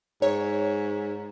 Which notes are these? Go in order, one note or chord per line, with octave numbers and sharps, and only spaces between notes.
G#2 C#5